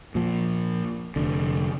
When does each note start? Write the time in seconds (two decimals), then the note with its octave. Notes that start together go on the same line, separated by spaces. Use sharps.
0.15 A#2 F3
1.16 F1 D3